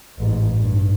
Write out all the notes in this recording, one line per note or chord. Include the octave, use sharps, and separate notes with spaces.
A1 G#2
G2